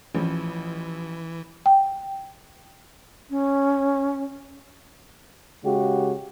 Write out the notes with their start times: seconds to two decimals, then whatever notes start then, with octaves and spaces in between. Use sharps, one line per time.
0.15 A1 E3 F3
1.66 G5
3.30 C#4
5.64 C#3 G#3 F#4 G4